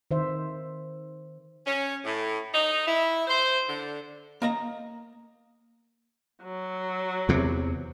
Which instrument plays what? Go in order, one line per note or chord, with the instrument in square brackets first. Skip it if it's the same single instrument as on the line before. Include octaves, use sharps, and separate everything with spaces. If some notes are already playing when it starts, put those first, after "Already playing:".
[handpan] D#3 C5 E5
[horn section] C#4
A2
D#4
E4
C5
D3
[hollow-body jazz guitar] A#3 D#5 A#5
[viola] F#3
[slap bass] E2 C3